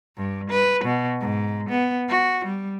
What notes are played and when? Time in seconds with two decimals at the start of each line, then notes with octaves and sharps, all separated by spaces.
0.17 G2
0.51 B4
0.84 B2
1.21 G#2
1.70 B3
2.09 F#4
2.45 G3